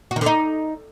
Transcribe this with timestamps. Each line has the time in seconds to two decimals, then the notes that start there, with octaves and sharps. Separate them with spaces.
0.11 F#4
0.16 D#3
0.21 D3
0.26 D#4